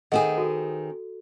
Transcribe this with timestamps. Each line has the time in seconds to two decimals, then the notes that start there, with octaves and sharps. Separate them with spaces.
0.12 D#3 C4 G#4 A4 D#5 F#5
0.38 F#4 A4